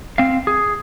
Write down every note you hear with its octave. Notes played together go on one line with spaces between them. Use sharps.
C4 F5
G#4